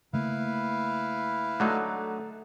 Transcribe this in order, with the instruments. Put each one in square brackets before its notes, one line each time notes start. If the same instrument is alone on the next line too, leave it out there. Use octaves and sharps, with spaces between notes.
[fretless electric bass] C#3 A3 A#3 [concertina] E4 B4 F5
[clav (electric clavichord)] D3 F#3 D#4 [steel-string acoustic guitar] A3